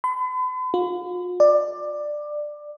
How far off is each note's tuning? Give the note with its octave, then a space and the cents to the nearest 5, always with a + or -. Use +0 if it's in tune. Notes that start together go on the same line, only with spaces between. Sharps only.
B5 +45
F4 +40
D5 +15